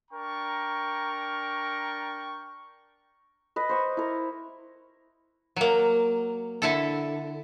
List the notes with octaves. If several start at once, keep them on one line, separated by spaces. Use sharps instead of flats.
D4 A#4 G5 A#5 C#6
B4 D#5
C5 C#6 D#6
E4 A#4
F#3 A#3
D3 E4 A4